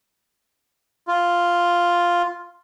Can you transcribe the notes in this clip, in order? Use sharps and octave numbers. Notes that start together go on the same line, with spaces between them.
F4